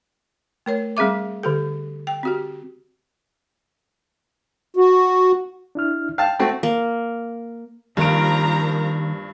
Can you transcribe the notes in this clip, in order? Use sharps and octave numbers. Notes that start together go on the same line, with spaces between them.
A3 A#4 C#5
G3 C4 G#4 E5 D6
D3 G4 A4
G5
C4 F#4 G4
F#4
D4 E4 F6
F5 G5 A5
A3 C4 F#4
A#3
G2 D#3 F3 A#3 A#4 A#5 D7